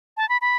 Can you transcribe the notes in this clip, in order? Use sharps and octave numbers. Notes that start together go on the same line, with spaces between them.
A5
B5
B5